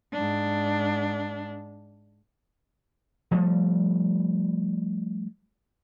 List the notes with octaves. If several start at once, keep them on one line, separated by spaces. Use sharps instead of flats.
G#2 D4
F3 G3 A3